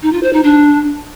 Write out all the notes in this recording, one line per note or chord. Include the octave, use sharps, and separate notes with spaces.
D#4
F4
C5
D#4
D4